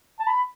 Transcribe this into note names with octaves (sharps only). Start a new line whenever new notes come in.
A5
B5